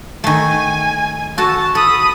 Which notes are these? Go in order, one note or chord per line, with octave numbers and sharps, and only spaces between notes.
D#3 A3 G#5
F#4 A4 A5
A4 B5 D#6